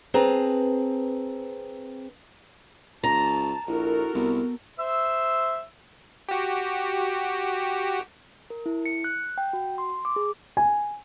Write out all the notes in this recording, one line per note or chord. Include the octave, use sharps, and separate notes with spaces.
C4 G#4 B4 A5 A#5
C#2 A5 A#5
A#1 E4 F#4 A4 A#4
C2 B3
C5 E5 E6
F#4 G4
A#4
E4
C#7
F#6
G5
F#4
C6
D6
G#4
G#5